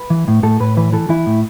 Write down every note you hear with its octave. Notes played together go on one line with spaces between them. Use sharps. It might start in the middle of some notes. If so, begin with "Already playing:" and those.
Already playing: B4
E3
A2
A2 A4
A2 B4
E3 B4
E3 A4
E3 E4
A2